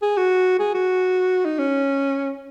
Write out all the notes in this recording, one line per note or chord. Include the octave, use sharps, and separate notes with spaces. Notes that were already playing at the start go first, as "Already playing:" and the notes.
G#4
F#4
G#4
F#4
D#4
C#4